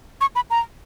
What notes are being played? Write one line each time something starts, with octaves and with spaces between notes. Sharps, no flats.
C#6
B5
A#5